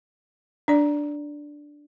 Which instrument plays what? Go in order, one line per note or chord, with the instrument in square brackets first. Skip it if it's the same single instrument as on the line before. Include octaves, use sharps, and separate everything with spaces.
[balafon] D4 D5